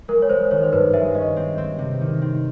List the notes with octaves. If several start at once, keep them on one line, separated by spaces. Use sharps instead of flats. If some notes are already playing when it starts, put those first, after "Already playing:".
G#3 A#4
C#5
G#3 C5
D#3 C#5
C5
G2 B4
G#3 E5
C#4 D#5
C4
C4
C3
D#3
C4